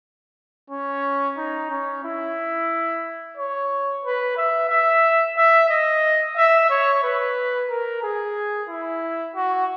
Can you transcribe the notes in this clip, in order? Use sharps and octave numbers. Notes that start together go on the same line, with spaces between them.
C#4
D#4
C#4
E4
C#5
B4
E5
E5
E5
D#5
E5
C#5
B4
A#4
G#4
E4
F#4